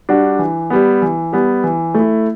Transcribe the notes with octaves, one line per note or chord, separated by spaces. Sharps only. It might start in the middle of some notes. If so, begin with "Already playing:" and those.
G3 D4 F#4
E3
G3 B3
E3
G3 B3
E3
A3 E4